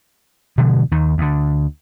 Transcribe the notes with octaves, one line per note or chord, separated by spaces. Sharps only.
B2 D3 F3 G#3
D#2 D#3
D2 D3